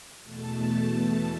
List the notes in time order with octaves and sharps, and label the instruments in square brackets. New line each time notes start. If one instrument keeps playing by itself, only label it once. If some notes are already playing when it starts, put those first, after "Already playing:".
[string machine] E2 B2 A3 A5